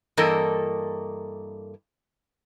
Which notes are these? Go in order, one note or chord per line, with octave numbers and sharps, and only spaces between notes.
G2 E3 A#3 A4 A#4 D#5